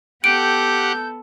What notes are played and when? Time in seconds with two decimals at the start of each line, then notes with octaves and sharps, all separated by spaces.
0.24 B3 G4 A4 F#5 G6 D7